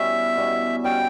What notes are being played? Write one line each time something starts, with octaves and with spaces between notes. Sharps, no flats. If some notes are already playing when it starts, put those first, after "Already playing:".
Already playing: B2 G3 C#4 E4 E5
B2 G3 C#4 E4
B2 G3 C#4 E4 G5